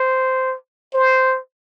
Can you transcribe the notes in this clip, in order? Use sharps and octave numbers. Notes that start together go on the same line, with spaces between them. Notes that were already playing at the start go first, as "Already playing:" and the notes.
Already playing: C5
C5